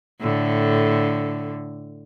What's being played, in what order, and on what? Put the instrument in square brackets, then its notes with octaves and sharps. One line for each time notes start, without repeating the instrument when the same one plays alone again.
[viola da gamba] A2 D3